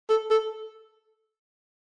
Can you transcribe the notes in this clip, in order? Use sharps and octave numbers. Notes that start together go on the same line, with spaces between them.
A4
A4